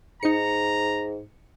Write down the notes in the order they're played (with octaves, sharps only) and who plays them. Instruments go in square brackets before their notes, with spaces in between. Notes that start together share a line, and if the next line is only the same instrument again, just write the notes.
[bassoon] G#2 [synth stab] D#4 C#7 [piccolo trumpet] A#5